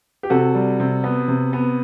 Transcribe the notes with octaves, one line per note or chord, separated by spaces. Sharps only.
G4
C3 F#4 A4
G3
C3
B3
C3
B3